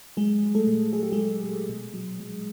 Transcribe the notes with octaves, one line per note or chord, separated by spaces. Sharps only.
F#3 G#3 G#4
F#3
A3 A4
A#2
F#3 G#4
G4
G#3 G#4
F#3
A#2
B2
F#3
F#3